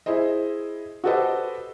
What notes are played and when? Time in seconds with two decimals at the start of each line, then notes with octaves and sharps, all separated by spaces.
0.06 E4 G#4 C5 D#5
1.04 F#4 G4 A4 B4 C5 D#5